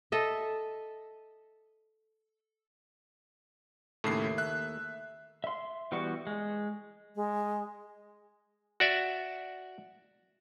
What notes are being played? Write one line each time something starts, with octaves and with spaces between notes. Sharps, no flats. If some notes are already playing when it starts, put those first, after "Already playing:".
A4 D#5 E5
D#2 A2 C#3 A3 C7
E5 F#6
E5 C6
E3 G3 B3 F#4 C#6
G#3
G#3
F#4 D5 E5